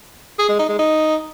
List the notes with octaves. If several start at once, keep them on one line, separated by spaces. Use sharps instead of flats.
G#4
G#3
D#4
G#3
D#4